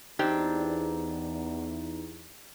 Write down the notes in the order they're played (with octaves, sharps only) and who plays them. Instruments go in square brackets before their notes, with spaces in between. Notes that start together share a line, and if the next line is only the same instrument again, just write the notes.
[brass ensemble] E2 [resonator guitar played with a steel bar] C4 D4 G4 [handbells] D#4